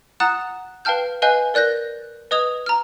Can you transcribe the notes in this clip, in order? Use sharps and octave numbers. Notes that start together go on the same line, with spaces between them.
F#5 A#5 D#6 F#6 A6 E7
B4 F5 G5 A5 F6 G6
B4 D#5 F5 G#5 F#6 G6
A#4 D5 F#6 G6 A#6
B4 D#5 D#6 G#6 F7
A#5 F6